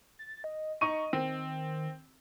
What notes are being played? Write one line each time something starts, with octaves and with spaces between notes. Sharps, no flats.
A6
D#5
D#4 D#5 C#6 D#7
D#3 C4